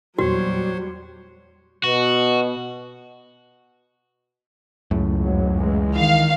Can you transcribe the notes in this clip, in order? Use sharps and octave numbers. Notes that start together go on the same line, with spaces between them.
E2 A#2 F#3 G3 F#4 C5 C#5
B2 F#4
C#2 F#2 A2
F2 F#3
E3 G#3
D#3 E3 F5